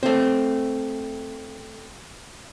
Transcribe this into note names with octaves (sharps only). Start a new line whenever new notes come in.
A3 C4